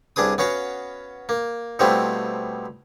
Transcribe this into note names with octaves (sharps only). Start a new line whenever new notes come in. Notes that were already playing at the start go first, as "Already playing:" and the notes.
C2 D4 G#4 B4 D#6
B3 C#4 F#4 F5
A#3
B2 F3 G3 A3 C4 E4